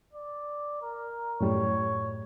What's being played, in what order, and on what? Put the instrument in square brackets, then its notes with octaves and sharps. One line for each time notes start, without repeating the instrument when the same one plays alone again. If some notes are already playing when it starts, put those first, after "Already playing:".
[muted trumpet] D5
A#4
[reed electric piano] F#2 A2 G3 [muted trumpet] C#5